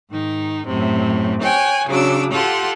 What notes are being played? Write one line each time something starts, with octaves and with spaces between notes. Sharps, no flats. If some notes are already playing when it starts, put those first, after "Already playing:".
G#2 D#3 D#4
F#2 A2 C3
C#5 G5 G#5 F#6
C#3 F#3 D4 D6 E6
F4 G4 A4 F#5 C6